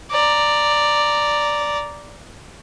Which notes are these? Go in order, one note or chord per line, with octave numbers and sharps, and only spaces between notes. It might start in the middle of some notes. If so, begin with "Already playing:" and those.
D5 A#5